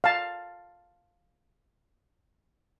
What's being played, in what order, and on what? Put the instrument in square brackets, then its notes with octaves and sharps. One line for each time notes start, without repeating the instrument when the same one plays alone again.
[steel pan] F5 A5